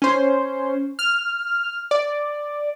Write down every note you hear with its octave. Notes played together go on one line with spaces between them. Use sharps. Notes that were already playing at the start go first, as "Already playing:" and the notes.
C#4 C5
F6
D5